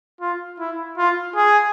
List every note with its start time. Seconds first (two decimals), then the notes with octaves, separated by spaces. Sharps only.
0.21 F4
0.59 E4
0.98 F4
1.36 G#4